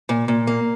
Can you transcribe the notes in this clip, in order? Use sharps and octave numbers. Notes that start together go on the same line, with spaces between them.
A#2
A#2
A#3